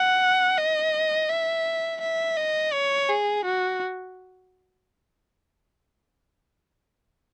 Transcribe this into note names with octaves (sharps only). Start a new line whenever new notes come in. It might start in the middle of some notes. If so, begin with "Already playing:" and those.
Already playing: F#5
D#5
E5
E5
D#5
C#5
G#4
F#4